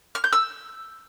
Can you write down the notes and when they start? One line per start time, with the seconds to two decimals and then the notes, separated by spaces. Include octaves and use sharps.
0.15 F6
0.24 G6
0.33 E6